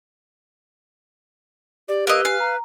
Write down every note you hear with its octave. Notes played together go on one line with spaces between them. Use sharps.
G4 D5
A#3 B4 D#5 E6 F7
F5 G#5
A#5